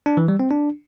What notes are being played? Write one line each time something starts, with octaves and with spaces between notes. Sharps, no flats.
D4
E3
G3
C4
D4